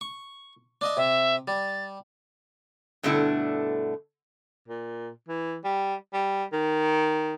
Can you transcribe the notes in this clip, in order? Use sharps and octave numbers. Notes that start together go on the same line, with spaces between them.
C#6
D4 D#5 E5
C3 E5
G3 A6
G2 B2 D3 A3 D4 E4
A#2
E3
G3
G3
D#3